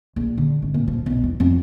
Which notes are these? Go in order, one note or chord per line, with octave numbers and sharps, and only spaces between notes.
A#1
D3
G#1
A#2
F3
B1
E2
F2